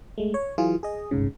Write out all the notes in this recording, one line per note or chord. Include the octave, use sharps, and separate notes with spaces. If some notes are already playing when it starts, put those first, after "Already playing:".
G#3 A3
C#5
E3 F#3 F4 G#4
G#4 D#5
G1 C2 G#2 C#3